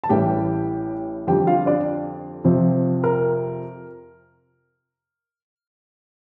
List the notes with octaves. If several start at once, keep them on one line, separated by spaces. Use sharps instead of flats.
A5
A1 A2 E3 G3 G4 G5
F2 D3 G3 G4 G5
F4 F5
D4 D5
F2 C3 F3 C4
A#4